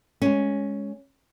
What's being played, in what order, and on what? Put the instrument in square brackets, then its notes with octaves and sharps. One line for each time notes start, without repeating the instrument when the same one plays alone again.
[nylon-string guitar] G#3 C#4